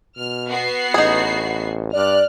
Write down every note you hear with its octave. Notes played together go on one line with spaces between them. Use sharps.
B2 F6
B3 F#4 C7
A1 D#4 G#4
G2 D5 F6 F#6